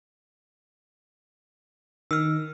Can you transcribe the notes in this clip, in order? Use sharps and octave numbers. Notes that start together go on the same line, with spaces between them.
D#3 E6 F6